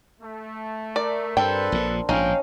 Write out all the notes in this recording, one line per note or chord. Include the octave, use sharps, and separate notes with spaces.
A3
A#4 D5
G2 C4 D4 A4 B4 G5
A#1 A#2
A#1 G#2 C#4 D#4 F5 G5